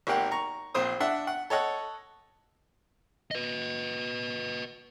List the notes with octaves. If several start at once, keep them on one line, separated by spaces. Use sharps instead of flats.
G#1 A#3 G4 F#5 G5
A#5 C#6
A#1 C4 C5 D#6
D4 E5 F#5
F#5
A4 C#5 D#5 F#5
B4 D#5